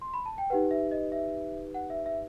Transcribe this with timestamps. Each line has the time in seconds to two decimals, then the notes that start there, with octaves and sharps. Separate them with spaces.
0.02 C6
0.14 B5
0.26 A5
0.38 G5
0.50 D#4 G4 B4 F#5
0.71 E5
0.91 D#5
1.12 E5
1.74 F#5
1.90 E5
2.06 E5